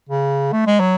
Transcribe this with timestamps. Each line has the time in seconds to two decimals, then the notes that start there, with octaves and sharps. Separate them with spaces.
0.09 C#3
0.52 A3
0.67 G#3
0.80 F#3